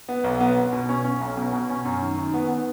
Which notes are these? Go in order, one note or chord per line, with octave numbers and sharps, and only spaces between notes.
B3
B1
B3
B3
B2
C#4
C#4
B1
B2
B2
C#4
F#2
D#3
D#3
B3
B3